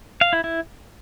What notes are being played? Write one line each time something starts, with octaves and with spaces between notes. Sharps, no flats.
F5
E4
E4